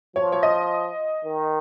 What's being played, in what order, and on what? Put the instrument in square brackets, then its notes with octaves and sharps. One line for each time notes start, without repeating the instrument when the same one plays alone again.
[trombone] F3 [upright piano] C#5
[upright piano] C#5
D#5
[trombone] D#3